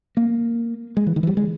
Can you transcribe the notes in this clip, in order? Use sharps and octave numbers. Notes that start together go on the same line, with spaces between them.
A#3
G#3
E3
D#3
E3
G3
G#3